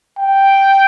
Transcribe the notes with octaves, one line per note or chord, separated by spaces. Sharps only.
G5